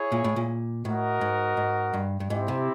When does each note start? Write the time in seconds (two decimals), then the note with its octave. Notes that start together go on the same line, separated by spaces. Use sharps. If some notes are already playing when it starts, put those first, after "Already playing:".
Already playing: E4 G#4 C#5
0.12 A#2
0.24 A2
0.36 A#2
0.85 A2 F#4 A#4 D#5 F#5
1.21 G#2
1.57 G#2
1.94 G2
2.20 G2
2.30 G#2 C4 E4 G4
2.48 C3